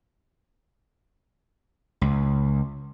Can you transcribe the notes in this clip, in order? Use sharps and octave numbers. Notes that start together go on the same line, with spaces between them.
C#2